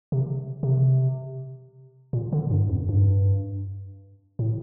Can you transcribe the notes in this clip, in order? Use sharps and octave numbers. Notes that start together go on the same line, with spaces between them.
C3
C3
A#2
D3
G2
F2
G2
A2